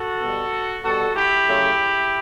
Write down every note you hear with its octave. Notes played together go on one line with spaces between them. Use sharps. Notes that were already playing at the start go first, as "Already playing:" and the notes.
Already playing: F#4 A4
B2 G3
B2 G3 F#4 A4
E4 G4
C#3 F#3 A3